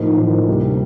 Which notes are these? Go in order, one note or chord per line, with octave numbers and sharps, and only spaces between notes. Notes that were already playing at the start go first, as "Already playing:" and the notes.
Already playing: A2 F3 A#3 D#4
A2 F3 A#3 D#4
D2 C3 G3